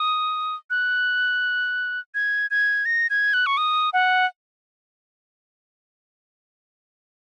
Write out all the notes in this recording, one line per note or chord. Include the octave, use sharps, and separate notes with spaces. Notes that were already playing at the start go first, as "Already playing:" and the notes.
Already playing: D#6
F#6
G#6
G#6
A#6
G#6
F#6
C#6
D#6
F#5